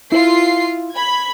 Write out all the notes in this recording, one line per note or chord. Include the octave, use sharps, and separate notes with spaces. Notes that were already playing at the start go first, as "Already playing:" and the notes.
E4 F4 C7
B5 G#6